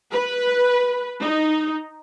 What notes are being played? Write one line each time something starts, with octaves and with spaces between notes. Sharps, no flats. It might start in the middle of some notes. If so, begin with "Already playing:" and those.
B4
D#4